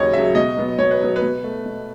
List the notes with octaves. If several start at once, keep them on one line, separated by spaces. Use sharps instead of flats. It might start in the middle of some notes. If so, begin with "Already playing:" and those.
Already playing: D#2 C#3 F#3 C#5 D#5
C#3 F#3 E5
B2 D#5
F#3 B3
B2 C#5
B4
F#3 B3
B4
B2
A3
B2